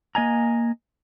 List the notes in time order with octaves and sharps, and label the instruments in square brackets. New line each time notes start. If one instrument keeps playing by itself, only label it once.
[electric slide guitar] A#3 D#5 G#5 A#5